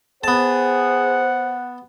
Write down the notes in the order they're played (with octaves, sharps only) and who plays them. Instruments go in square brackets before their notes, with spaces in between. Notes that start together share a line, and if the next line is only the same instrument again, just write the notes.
[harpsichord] B3 A5 [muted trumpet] G#4 [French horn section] C5 [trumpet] F#5